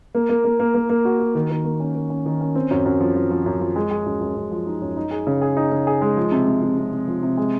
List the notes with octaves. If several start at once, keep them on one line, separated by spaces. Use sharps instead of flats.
A#3
A#3
A#3
A#3
A#3
A#3
F#4
F#4
D#3
D#3
A#3
C#4
D#3
C#4
D#3
C#4
C4
F#2
F#2
F3
F3
F3
F#2
F3
G#3
G#3
F#2
F#2
F#2
F3
D#4
F#2
D#4
G#4
C#3
G#4
D#4
C#3
G#4
G#3
F3
C3
C3
C3
C3
C3
F3
C3
G#3